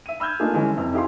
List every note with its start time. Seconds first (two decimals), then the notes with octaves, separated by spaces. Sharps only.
0.06 E5 D#7
0.20 B5 E6 F6 G6 G#6
0.40 A3 A#3 D4 D#4 F4 G#4
0.54 D3 E3 G3 G#3 C#4
0.77 F2 C3 E3
0.94 D#4 E4 G4 G#4 F5 C6